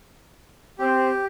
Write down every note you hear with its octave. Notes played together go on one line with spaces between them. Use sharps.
C4 G4